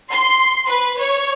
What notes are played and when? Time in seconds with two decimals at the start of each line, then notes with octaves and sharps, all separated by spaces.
0.12 C6
0.67 B4
0.99 C#5